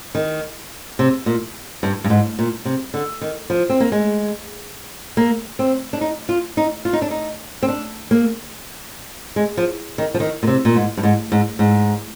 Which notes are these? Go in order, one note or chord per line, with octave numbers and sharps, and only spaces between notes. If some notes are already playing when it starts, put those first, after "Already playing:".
D#3
C3
A#2
G2
G2
G#2
A#2
C3
D3
D#3
F3
C4
A#3
G#3
A#3
C4
D4
D#4
F4
D#4
F4
D#4
D4
D#4
C4
D4
A#3
G#3
F3
D#3
F3
D#3
A#2
C3
A#2
G#2
G2
G#2
G#2
G#2